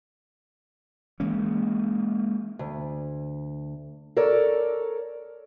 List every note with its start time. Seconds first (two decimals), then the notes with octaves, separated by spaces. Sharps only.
1.20 E3 G#3 A#3 C#4
2.59 D2
4.17 A4 A#4 C#5 D5